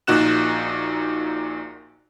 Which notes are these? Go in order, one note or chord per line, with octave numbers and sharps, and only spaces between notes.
A#1 A#2 D#4 F#4 F#6 E7